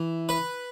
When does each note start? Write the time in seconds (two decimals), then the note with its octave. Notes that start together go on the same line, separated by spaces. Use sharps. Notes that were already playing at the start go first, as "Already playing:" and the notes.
Already playing: E3
0.29 B4